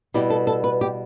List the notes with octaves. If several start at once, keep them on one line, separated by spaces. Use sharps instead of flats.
B2 G3 E4 G4
A4
A4
B4
G4